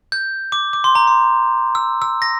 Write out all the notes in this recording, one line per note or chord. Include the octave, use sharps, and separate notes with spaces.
G6
D6
D6
C6
A#5
C6
E6
E6
A#6